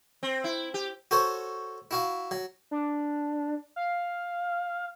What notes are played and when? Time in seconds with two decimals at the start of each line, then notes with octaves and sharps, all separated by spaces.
0.23 C4
0.44 E4
0.74 G4
1.11 F#4 A4 C5 C#5
1.91 E4 F#4 F5
2.31 F#3
2.71 D4
3.76 F5